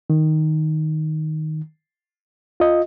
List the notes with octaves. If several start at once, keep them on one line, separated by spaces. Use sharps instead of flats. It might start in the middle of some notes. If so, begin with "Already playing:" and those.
D#3
F4 D#5